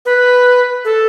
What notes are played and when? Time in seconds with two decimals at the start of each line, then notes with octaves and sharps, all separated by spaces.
0.06 B4
0.85 A4